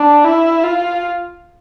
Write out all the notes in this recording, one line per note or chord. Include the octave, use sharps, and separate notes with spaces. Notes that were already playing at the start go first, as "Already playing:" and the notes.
Already playing: D4
E4
F4